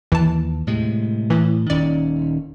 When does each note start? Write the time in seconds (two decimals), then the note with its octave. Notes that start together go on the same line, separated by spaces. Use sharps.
0.12 D#2 E3 A5
0.67 A2 C3 G#3
1.30 A2 E3
1.70 D#1 D#3 C#4 D5